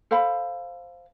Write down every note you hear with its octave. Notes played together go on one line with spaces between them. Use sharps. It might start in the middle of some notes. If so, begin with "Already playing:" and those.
A4 C5 F5 B5